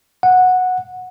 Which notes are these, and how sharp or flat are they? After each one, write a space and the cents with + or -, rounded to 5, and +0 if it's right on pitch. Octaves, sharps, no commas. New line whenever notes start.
F#5 -10